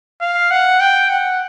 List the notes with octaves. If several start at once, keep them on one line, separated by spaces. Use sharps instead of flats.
F5
F#5
G5
F#5